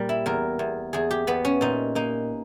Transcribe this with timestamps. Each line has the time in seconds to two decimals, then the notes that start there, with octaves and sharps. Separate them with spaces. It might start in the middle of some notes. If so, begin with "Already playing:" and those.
Already playing: A#2 G3 A#4
0.09 E4
0.26 E2 A#4
0.59 E2
0.93 E2 G#4
1.11 G4
1.27 E2 B3
1.45 C#4
1.61 A#2 D#4
1.95 A#3 D#4